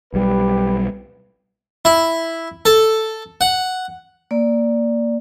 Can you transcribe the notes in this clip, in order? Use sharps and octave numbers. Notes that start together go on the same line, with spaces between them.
B1 G3 G4 B4
E4
A4
F#5
A#3 D5